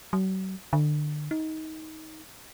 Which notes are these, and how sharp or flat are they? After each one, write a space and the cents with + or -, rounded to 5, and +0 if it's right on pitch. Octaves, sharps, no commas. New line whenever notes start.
F#3 +40
D3 +30
D#4 +20